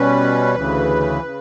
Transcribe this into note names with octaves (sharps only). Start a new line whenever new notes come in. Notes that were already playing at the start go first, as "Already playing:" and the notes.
Already playing: B2 G3 C#4 B4
D2 C#3 E3
C#3